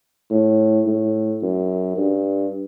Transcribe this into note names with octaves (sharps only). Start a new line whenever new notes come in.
A2
A2
F#2
G2